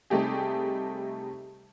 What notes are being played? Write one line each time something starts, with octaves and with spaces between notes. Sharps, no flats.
C3 G3 A3 D#4 G4 G#4